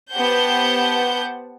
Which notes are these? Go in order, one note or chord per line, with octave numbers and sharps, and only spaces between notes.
B3 G4 C5 F#5 A5 G6